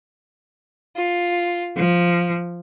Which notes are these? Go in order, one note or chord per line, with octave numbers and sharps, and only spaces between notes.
F4
F3